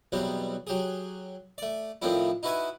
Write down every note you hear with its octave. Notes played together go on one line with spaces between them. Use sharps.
E2 B2 F#3 G3 C4
F#3 G4 G#4
A3 D5
A2 D#3 F3 C4 D4 E4
D#4 E4 F#4 B4 E5 G#5